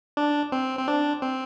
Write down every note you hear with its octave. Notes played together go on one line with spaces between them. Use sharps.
D4
C4
C4
D4
C4